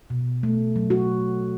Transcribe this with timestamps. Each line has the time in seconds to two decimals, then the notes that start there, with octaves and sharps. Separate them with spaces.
0.10 B2
0.43 A3
0.76 F#3
0.90 F#4